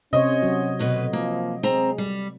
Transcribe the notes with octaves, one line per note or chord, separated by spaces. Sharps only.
C3 C#4 C5 C#5 D#5
F#3 F#4
D2 B2 B4
F3 A#3
G#3 C4 A#5
G3